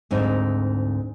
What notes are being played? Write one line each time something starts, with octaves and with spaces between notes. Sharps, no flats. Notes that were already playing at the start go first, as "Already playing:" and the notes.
D2 G#2 C4 D#4